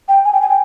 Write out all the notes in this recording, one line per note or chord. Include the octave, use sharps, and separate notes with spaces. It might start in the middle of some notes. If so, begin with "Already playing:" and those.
G5
G#5
G5
G#5
G5